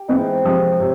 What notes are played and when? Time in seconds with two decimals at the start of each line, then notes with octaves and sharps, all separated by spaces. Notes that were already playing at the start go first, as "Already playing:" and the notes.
Already playing: G4
0.08 E3 G#3 B3 C4 D#4 C5
0.44 C3 F3 G#3
0.80 C3 C#5